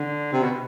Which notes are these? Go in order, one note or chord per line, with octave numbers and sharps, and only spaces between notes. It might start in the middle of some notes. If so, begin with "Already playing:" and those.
Already playing: D3
C3
B2